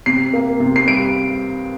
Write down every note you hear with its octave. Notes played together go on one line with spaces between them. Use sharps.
C3 C7
A#3
C3
C7
G3 D7